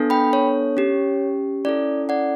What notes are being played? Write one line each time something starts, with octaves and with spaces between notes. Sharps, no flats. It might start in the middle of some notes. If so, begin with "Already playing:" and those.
Already playing: B3 D4 A4
G5 B5
C#5
C#4 G4
C#4 E4 A4 D5
D5 F#5